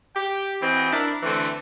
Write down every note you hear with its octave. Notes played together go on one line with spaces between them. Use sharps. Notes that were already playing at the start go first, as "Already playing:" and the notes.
G4 G5
E3 C4 E4 F#4 D#5
D4 E4 A#4
D3 E3 A3 C4